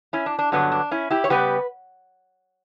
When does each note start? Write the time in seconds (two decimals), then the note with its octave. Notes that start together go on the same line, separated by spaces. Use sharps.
0.13 C#4 E4
0.26 D4
0.39 D4
0.52 G2 D3 F#3 B3 D4
0.72 D4
0.91 C#4 E4
1.11 E4 G4
1.24 C#5
1.30 C#3 G3 B3 G4 B4